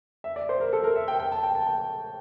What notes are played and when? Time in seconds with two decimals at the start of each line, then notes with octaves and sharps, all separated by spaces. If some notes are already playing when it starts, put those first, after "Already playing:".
0.24 E5
0.36 D5
0.49 C5
0.60 A#4
0.73 A4
0.84 A#4
0.96 E5
1.08 G5
1.20 G5
1.32 A5
1.43 G5
1.55 A5
1.67 G5